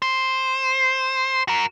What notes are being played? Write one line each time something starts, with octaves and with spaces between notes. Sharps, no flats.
C5
F#4 A#4